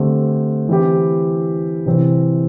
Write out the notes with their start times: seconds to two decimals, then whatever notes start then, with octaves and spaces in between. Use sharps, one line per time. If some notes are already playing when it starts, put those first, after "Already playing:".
Already playing: D3 A3 C4 G4
0.69 E3 C4 E4 G4
1.86 C3 E3 C4